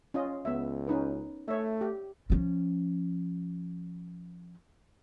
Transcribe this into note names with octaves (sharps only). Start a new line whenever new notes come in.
C#4 F4 D#5
C#2 B3 E5
C#4 D#4 B4
A3 C#5 E5
G4
F3 C#4